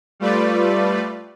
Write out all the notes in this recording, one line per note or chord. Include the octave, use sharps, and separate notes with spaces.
G3 A3 F4 B4 D5